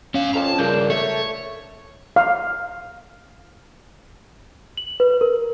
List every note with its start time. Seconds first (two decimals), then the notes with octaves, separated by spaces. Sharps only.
0.14 G#2 C#4 F5
0.34 F2 A5 A#5
0.58 C#2 G2 C#3 A#3 D4 G6
0.90 A3 A4 C#5 E5
2.16 F5
4.77 F#7
5.00 B4
5.21 A#4